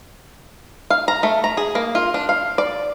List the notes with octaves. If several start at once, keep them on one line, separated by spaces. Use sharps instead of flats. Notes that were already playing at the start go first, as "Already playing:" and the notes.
F5
A#5
A3
A#5
G#4
A#3
F4
D4
F5
D5